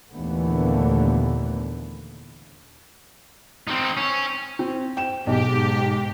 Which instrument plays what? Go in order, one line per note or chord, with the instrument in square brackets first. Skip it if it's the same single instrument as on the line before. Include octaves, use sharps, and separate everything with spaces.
[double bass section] D#2 A#2 D3 E3 A3 B3
[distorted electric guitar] C4 D#4
C#4
[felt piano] C4
G5 E7
[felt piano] B1 [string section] G#2 G4